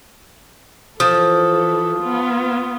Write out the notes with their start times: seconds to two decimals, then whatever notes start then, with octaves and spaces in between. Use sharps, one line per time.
1.00 E3 F3 A4 D#6
2.00 B3 F4